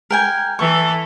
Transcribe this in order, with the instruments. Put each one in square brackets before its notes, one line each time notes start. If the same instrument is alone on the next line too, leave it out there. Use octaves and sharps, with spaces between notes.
[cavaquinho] A#4 G5 G#5
[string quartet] E3 A4 [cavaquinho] C#6